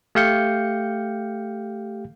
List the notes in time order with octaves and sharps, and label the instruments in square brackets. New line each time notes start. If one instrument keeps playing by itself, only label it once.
[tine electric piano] A3 G4 F5 G6 C#7